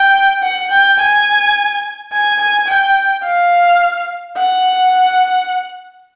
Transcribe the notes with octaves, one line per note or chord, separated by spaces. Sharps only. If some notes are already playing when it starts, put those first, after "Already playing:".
Already playing: G5
F#5
G5
G#5
G#5
G#5
G5
F5
F#5